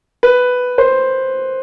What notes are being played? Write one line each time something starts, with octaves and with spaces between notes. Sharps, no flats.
B4
C5